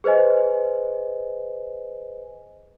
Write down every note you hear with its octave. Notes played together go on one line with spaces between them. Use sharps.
G#4 B4 C5 D#5 G#5